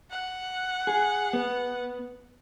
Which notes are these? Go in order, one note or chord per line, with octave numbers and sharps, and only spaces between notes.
F#5
G#4
B3